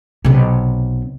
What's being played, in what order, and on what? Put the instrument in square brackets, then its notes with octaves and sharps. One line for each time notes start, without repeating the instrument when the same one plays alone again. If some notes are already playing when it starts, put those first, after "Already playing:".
[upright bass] B1 C3